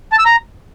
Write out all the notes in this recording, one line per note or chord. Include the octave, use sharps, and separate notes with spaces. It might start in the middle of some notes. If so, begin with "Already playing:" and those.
A5
E6
A#5